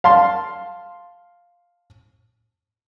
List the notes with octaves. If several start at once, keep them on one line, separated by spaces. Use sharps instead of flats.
F5 A5 C6